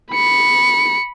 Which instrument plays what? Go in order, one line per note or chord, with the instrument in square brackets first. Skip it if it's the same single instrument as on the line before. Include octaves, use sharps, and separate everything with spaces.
[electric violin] B5 C#7